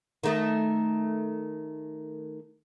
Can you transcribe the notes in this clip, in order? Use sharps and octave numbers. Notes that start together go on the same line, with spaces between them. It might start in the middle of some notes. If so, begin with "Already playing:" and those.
D#3 A3